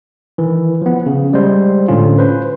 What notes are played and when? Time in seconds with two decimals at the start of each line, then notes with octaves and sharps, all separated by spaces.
0.38 D#3 E3
0.82 F3 B3
1.06 C#3
1.33 G3 G#3 C5
1.88 A2 D3 C#4 F4
2.18 B4 C5